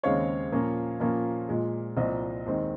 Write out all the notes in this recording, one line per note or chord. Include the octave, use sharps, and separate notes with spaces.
D#2 C#3 G#3 C4 D#4 C#5 F5
A#2 F3 A#3 C#4
A#2 F3 A#3 C#4
A#2 F3 G#3
C2 A#2 F3 C4 C5 D#5
D#2 D#3 G#3 C4 D#4 C5